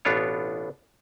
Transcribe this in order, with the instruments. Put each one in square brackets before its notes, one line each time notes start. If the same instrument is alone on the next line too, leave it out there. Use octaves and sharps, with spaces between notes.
[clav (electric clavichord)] A1 B2 B3 D4 F4 C#5